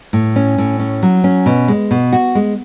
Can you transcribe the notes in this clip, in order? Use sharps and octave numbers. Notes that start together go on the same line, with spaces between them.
A2
C#4
A2
C#4
F#3
C#4
B2
G#3
B2
F#4
G#3